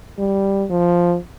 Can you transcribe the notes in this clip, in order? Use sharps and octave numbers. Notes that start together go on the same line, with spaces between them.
G3
F3